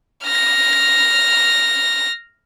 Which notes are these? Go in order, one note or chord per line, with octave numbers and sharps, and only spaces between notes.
F6 A#6